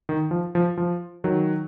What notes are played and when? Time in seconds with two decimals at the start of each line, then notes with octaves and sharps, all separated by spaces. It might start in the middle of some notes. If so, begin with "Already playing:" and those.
0.09 D#3
0.31 F3
0.55 F3
0.77 F3
1.24 D#3 F#3